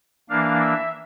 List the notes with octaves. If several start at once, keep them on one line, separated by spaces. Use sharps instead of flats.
E3 A#3 D4 F5
E5